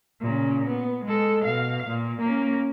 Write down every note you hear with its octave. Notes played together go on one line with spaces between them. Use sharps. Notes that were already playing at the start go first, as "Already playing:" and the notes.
A#2 C#3
B3
G#3 A4
B2 F5
A#2
A#3 C#4